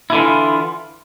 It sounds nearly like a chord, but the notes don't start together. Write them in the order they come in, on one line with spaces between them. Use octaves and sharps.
E4 D3 E3 F4